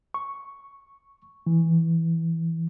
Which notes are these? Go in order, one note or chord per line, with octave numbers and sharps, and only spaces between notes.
C#6
E3